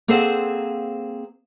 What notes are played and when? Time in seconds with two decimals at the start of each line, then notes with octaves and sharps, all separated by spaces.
0.08 A#3 C4 G#4 A4 C5 F#5